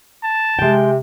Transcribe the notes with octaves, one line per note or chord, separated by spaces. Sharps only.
A5
C3 G#3 G5